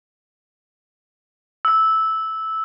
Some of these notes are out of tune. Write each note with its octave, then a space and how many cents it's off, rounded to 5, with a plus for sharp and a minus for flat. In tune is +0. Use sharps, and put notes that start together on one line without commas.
E6 -10